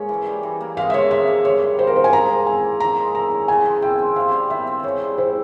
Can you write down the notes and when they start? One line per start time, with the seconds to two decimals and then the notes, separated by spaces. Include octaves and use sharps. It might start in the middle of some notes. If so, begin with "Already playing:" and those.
Already playing: G#2 A#3 C#4
0.09 E3
0.26 G3
0.43 E3
0.61 A#3
0.77 G#2 F5
0.90 E5
0.94 F3 C#5
1.10 G#2 E5
1.28 A#3
1.44 G2 C#5
1.62 G3
1.79 F4 C5
1.87 A#4
1.95 A#3 C5
2.04 G#5
2.12 G#2 A#5
2.30 F3
2.46 E4 G#5
2.64 A#3
2.80 F3 A#5
2.97 G#3
3.15 E4 A#5
3.31 C#4
3.48 C#3 G#5
3.66 F3
3.82 E4 G5
3.99 C4
4.16 C3 F5
4.32 G3
4.50 C3 E5
4.67 C4
4.83 C#3 C#5
5.01 G3
5.17 E4 C5